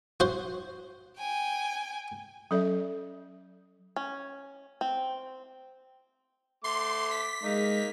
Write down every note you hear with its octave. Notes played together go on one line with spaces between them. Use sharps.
F#4 C5
G5 G#5
F#3 C#4 A4 D5 E5
C#4
C4
A3 C6 D6
B6
G#3 A#3 D#4